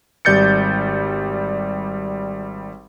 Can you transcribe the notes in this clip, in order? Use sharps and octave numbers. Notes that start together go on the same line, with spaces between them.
G#1 G3 D5 G6 A6 C#7